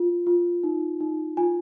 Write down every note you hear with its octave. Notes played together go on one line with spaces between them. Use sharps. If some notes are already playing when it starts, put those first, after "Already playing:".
Already playing: F4
F4
D#4
D#4
F4 G#5